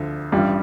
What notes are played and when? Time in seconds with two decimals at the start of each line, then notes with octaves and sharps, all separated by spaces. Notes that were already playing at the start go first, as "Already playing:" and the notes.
Already playing: D2 D3 F3
0.32 A1 G2 G3 F4